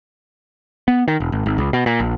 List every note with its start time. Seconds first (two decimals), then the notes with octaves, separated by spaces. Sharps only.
0.88 B3
1.08 D#3
1.20 E1
1.32 G#1
1.46 G#1
1.58 C#2
1.73 B2
1.86 A#2
2.00 A#1